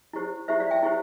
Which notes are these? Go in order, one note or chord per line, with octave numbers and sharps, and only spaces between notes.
E4 G4 C5
E4 G4 C5 E5
D5 F5
E5 G5
E4 G4 C5